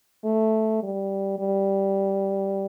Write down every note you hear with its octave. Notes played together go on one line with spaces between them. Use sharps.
A3
G3
G3